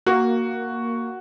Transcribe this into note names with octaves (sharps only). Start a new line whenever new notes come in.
A#3 F#4